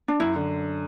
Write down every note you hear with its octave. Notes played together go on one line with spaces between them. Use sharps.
D4
F#2 E4
D3